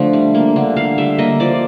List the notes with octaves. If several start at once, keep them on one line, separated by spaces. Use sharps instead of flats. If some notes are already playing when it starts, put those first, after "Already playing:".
Already playing: D3 F3 A3 D4
G3
A#3
D3
D3 F5
G3 E5
A#3 D#5
F3 D5